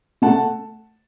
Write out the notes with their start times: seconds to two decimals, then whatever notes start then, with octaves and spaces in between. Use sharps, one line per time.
0.22 A3 F#5 A5